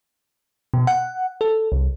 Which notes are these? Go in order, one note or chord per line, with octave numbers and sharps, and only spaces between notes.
B2
F#5
A4
C2